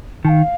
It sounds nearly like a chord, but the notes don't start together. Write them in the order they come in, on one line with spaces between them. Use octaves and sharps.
D#3 A5 F5